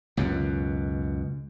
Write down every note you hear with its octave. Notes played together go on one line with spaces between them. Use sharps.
C#2 F#2 B2